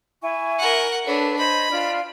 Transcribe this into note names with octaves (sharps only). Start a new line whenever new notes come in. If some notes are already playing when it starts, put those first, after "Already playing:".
E4 G#5 C#6
A#4 F#5
D4 A4 B4 C#5
C5 D#5 B5 G#6
D4 F4 F6